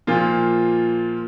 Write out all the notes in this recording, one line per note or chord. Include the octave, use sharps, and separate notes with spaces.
A#2 F3 A#3 F4